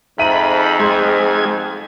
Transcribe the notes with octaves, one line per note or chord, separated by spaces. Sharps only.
F2 G#2 E5 A#5 B5 D#7
G#3 G#4 C6 G#6